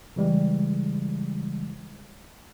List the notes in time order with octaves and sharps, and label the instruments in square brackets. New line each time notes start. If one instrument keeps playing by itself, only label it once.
[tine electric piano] C#3 E3 G3 G#3